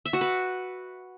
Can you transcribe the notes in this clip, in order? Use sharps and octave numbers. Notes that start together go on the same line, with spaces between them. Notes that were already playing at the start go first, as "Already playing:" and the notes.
E5
F#4
B4